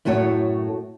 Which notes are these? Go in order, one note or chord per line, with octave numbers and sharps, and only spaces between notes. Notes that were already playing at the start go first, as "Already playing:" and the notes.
F#2 A2 A3 F#4 C#5